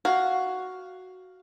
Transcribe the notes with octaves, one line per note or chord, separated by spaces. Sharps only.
F#4 F5